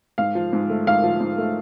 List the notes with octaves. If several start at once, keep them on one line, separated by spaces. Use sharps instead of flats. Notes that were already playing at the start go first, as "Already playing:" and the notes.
G#2 F5
F3
G#2
A3
G#2 F5
F3
G#2
A3